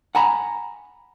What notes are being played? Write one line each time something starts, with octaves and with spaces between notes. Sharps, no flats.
F#5 G#5 A#5 B5